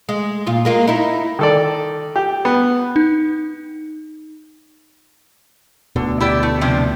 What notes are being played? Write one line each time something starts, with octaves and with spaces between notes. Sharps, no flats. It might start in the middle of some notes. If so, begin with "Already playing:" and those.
G#3
A#2 F4
G#3 A#3 F4
D#4 E4
D#3 A4 D5
G4
B3
D#4
D2 B2 D3
E4 G4 D5
A3
C3 F3 D4